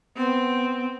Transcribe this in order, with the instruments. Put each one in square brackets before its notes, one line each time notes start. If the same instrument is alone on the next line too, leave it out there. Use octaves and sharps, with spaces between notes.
[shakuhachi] B3 [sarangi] C4